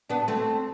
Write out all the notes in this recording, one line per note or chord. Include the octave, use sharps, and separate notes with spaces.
B3 D4
A3 C4